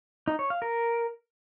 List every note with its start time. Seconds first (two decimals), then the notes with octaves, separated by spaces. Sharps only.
0.28 D#4
0.39 C#5
0.50 F5
0.62 A#4